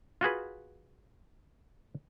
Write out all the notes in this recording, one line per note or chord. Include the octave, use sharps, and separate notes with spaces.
F4 F#4 G#4 B4